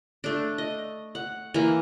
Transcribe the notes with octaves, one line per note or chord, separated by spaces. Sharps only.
A3 D4
D#5
F#5
E3 A#3